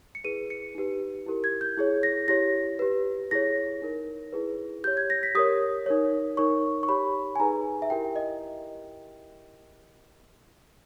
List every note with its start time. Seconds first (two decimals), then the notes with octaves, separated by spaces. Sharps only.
0.15 C#7
0.24 E4 G#4 B4 D#7
0.50 C#7
0.75 D#4 G4 B4
1.26 E4 G4 A#4
1.44 G#6
1.61 G6
1.77 E4 G#4 C#5
2.03 A#6
2.28 E4 G4 C#5 A#6
2.79 G4 B4
3.31 E4 G#4 C#5 A#6
3.82 D#4 A#4 C#5
4.32 E4 G#4 B4
4.84 G4 C#5 G6
4.97 G#6
5.10 A#6
5.23 B6
5.35 G4 A#4 C#5 D#6
5.86 D#4 A#4 C#5
6.37 D#4 A#4 C#5 C#6
6.83 C#6
6.89 G4 C#5 B5
7.35 G#5
7.40 D#4 G#4 B4 A#5
7.82 E5
7.90 E4 G4 A#4 G5
8.16 D#5